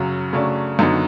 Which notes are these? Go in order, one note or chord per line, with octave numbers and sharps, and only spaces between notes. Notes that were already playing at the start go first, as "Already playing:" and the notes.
Already playing: F#2 C#3 F#3
C#3 F#3 A3 D4
F#2 D3 F#3 B3 D#4